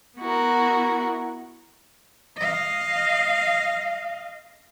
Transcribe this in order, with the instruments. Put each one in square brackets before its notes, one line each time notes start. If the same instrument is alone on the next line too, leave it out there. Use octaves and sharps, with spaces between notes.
[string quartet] B3 E4 F#4 A#4
[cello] D#5 F5